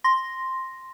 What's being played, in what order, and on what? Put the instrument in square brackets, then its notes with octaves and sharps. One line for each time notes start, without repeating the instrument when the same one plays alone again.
[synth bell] C6 A#6